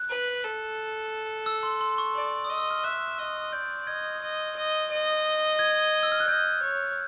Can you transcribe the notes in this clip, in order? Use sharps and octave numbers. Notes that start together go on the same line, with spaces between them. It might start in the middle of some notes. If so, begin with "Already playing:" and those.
Already playing: F#6
B4
A4
E6
C6
C6
C#6
D5
D#6
D#5
E6
F6
E5 F#6
D#5
D5 G6
D#5 G#6
D#5
D#5
D#5
G#6
E6
F6
F#6
D#5 G6
C#5